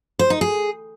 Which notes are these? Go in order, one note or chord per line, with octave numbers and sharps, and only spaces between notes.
C5
D#4
G#4